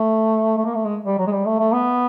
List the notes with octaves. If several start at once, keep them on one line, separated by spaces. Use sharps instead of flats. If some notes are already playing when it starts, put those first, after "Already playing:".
Already playing: A3
A3
A#3
A3
G#3
G3
F#3
G#3
G3
A3
A3
B3